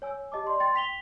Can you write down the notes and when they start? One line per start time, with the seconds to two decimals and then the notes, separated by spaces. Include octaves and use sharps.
0.02 C#5 G#5 E6
0.32 G4 D#5 A5 D6
0.47 D5 C6
0.60 G5 C6 A6
0.74 G5 B6 F7 G7